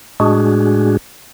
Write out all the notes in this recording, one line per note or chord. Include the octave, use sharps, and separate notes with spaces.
A2 G#3 D4 F#4 G#4